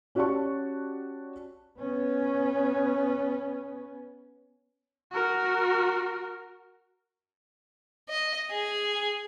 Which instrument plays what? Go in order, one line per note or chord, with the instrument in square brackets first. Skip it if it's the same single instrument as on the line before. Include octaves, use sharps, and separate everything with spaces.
[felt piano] C#4 F#4 G4 D5 A5 C#6
[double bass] B3 C#4
[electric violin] F#4 A#4
[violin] D#5
G#4